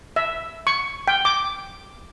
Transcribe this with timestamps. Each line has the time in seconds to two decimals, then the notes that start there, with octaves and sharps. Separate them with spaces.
0.16 E5
0.67 C#6
1.08 G5
1.25 D6